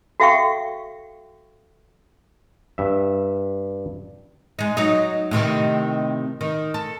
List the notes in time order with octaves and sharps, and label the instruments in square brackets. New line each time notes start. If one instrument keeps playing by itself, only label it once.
[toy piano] F#4 A4 E5 F5 G5 C#6
[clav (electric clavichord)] G2 E5
[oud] G#3 D#4
F#3 D#4
A2 C3 D#3
D#3
A4